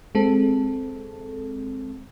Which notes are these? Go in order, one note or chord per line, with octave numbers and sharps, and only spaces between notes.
G#3 C4 A4